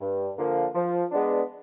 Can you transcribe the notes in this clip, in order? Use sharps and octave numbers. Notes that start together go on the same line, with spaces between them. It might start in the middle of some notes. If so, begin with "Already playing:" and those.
G2
D3 F3 A#3
F3
G#3 B3 D4